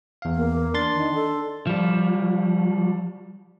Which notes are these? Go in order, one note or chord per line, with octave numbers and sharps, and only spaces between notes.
E2 F5
A#3
D4 C6 A6
D#3
A4
F3 G3